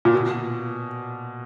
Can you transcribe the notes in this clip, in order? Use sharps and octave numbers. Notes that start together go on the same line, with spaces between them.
A#2
B2